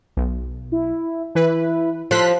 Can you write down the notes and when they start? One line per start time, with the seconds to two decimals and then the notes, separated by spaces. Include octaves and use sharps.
0.17 B1
0.72 E4
1.35 E3 E4 B4
2.11 F3 A4 C6 F#6 B6